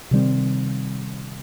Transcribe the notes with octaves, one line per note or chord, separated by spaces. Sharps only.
C3 D#3 G3 C4